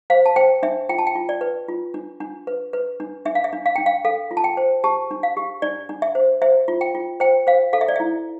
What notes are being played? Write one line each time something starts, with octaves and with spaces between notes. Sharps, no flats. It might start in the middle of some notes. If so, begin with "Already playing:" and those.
C5 F5
A5
C5 G5
D4 E5
F4 G5
A5
G5
F4
D5
B4
F4
D4
D4
B4
B4
D4
D4 E5
F5
E5
D4
F5
D4 G5
F5
A4 F5
F4
A5
G5
C5
G4 A5
D4
F5
G4
D4 D5
D4
E5
C5
C5 E5
F4
G5
F4
C5 G5
C5 F5
A4 F5
E5
D5
E4 E5